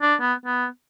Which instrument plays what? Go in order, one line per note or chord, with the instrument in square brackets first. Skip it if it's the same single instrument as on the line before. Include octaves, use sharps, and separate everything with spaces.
[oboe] D4
B3
B3